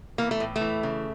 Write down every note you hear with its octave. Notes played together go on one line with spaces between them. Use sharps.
E3 A#3
A3
A2
A3
E3
C#3